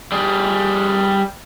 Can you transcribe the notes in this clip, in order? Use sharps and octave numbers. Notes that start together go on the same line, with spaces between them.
G3 G#4